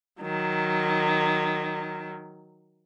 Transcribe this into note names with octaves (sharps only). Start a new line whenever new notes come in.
D#3 F#3